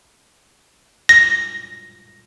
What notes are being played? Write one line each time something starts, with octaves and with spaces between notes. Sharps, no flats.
A#6